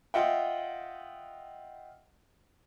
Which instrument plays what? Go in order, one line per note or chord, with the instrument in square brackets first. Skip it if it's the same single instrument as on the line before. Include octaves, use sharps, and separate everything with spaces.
[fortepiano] F4 D#5 E5 F#5 G5